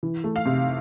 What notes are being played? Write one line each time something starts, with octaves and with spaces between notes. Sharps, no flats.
E3
A3
F5
C3